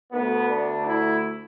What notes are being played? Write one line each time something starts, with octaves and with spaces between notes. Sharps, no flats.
D2 D3 A3 B3
D4
E4